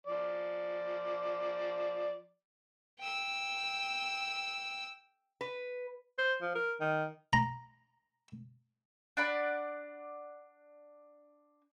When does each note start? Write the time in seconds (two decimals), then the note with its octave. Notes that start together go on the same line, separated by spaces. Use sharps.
0.07 F3 D5
2.99 G5 E6
5.41 B4
6.18 C5
6.42 F3
6.55 A#4
6.80 D#3
7.33 A#5
9.17 D4 D5 F#5 B5